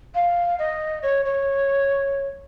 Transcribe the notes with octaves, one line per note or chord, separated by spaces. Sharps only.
F5
D#5
C#5
C#5